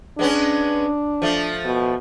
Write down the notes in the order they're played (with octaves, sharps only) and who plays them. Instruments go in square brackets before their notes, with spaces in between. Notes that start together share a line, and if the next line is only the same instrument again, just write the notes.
[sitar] G#3 B3 C#4 [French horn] D4
[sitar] F3 A3
[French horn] B2